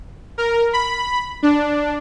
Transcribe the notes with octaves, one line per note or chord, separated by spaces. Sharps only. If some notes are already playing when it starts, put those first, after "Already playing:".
A#4
B5
D4